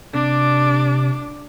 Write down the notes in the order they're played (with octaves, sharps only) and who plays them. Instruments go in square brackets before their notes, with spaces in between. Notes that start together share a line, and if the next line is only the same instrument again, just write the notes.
[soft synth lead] C3 [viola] D4 D6